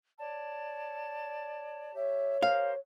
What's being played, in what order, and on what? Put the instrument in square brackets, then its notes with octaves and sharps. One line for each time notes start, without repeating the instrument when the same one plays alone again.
[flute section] C#5 D5 A5
[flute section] G4 E5 [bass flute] C#5
[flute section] G4 A#4 C5 [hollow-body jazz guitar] F5